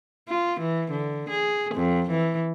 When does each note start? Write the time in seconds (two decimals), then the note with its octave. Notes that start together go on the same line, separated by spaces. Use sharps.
0.28 F4
0.60 E3
0.91 D3
1.29 G#4
1.75 F2
2.10 E3